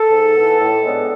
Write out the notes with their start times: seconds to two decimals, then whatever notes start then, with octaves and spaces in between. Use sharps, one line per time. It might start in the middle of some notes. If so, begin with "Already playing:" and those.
Already playing: A4
0.11 G#2
0.36 E3 B3
0.60 A2
0.84 G#3 B3 D4